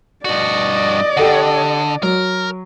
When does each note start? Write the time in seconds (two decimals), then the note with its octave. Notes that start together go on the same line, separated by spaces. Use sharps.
0.25 G2 F#4 D5 D#5
1.17 D3 G4 A4 F#5
2.03 F#3 A#4